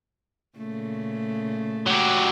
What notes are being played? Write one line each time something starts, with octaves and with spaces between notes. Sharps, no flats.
A#2 C#3 A3
F#3 G4